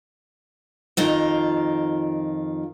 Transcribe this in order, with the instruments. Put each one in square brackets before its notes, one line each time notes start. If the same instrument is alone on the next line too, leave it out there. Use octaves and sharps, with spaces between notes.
[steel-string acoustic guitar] F2 D#3 F4